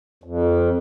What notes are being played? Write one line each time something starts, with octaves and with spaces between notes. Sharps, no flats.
F2